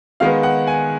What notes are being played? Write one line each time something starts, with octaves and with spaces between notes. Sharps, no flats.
D#3 G#3 B3 F5
F#5
G#5